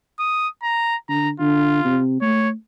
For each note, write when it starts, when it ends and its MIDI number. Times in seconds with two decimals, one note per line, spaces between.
0.19 0.48 87
0.63 0.96 82
1.09 1.31 50
1.09 1.29 82
1.40 1.80 50
1.40 2.01 65
1.85 2.20 48
2.22 2.53 57
2.22 2.49 73